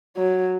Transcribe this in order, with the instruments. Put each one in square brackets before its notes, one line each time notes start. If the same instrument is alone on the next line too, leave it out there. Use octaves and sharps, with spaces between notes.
[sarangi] F#3